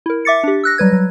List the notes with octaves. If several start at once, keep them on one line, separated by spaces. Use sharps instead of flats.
E4 A#4
E5 D6 A6 C#7
D4 G4
E6 F#6 A#6
F#3 G3 B4 G#6
F#3